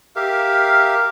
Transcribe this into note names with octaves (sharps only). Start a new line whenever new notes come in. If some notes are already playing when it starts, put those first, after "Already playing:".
G4 A#4 E5 F5